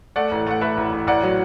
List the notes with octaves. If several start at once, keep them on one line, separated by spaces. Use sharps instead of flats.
A3 D5 F#5
A1
A3 F#5
A3 B4 E5
A1
A1
A1 D5 F#5
F#3